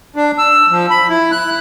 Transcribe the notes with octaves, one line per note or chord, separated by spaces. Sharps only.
D4
E6
F3
B5
E4
F#6